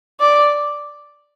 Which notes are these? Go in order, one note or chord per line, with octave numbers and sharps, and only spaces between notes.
D5